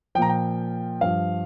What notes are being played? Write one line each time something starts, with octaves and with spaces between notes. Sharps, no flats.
A#2 F3 G5 A#5
G5
G2 F3 F5